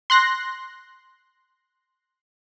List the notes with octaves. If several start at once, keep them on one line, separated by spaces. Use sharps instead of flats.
C6 F#6 A#6